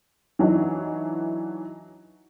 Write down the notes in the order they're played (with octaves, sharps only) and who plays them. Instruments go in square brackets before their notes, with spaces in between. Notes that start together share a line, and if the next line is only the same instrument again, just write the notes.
[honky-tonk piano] E3 F#3 D4 D#4